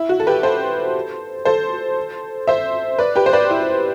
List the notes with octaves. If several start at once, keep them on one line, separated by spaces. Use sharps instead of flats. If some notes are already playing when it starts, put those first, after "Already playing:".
Already playing: E4
F#4
A4
G4 B4
A4 C5
A4 C5
C5 E5
B4 D5
G4 B4
C5
B4 D5
E4